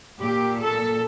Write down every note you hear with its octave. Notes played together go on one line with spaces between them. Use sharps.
A#2 G4
A4